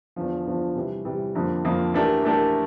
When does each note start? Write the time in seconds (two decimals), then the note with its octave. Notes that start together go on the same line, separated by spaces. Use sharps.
0.16 E2 D3 F3
0.46 E2 D3 F3
0.75 C3 E3 G3
1.05 C3 E3 G3
1.35 F2 D3 F3 A#3
1.65 F2 D3 F3 A#3
1.94 E3 A3 D4 G4 A#4
2.24 E3 A3 D4 G4 A#4